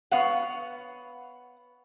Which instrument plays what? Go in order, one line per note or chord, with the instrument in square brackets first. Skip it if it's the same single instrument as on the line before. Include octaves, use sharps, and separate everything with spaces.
[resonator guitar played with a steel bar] B3 C#5 F5 F#5